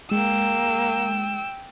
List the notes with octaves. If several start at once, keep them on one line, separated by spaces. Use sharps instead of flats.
G#3 A#3 G5 E6